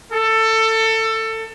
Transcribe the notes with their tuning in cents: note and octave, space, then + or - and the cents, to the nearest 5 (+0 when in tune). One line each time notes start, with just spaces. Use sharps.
A4 +20